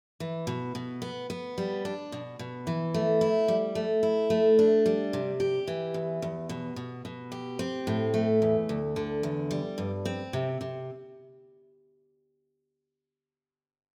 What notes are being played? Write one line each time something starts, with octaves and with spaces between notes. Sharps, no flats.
E3
B2
B2
B3
B3
G3
D4
B2
B2
E3
A3
E4
G3
A3
E4
A3
D4
G3
C3
G4
E3
E2
E2
B2
B2
B2
G4
C4
A2
A3
E2
D2
D3
E2
G3
G2
C4
C3
C3